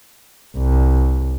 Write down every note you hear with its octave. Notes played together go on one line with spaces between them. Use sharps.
C2